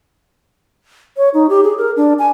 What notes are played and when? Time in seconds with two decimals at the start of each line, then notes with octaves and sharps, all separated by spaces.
1.17 C#5
1.34 D#4
1.50 G4
1.64 G#4
1.78 A#4
1.97 D4
2.19 G#5